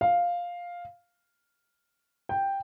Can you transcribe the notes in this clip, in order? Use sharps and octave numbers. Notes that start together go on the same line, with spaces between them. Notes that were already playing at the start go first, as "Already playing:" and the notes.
F5
G5